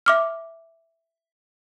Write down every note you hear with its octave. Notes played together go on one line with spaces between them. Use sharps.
E5 D6 F6